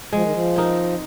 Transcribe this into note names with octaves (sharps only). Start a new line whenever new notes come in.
F3 G#3
D#3
F3
C4 D#4 A#4